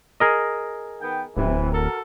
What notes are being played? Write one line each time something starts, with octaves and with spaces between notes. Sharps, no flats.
G#4 A#4 D#5
D#3 B3 G5
D1 C3 E3
F#4 A4 A#4